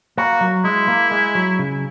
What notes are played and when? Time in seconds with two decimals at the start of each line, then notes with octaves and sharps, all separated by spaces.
0.18 A#3 F#4
0.41 F#3
0.64 G#3 E4
0.88 A#3
1.11 G#3
1.35 F#3
1.59 C#3